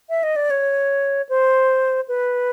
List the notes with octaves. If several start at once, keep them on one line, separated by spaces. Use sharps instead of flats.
E5
D#5
D5
C#5
C5
B4